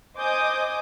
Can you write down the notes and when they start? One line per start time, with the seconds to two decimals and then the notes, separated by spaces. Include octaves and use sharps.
0.17 C5 D#5 G#5 D6 D#6 G6